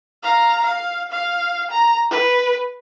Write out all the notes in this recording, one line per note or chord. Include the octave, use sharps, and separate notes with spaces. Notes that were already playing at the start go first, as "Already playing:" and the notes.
F5 A#5
F5
F5
A#5
B4